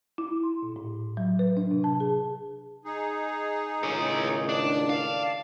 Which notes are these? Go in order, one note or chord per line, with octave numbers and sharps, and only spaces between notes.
E4
C6
A#2
A2
F#3
B4
D4
C3
A5
G#4
D#4 G#4
C#2 A2 D#3 C#5 D#5
D4 D5 A5
F5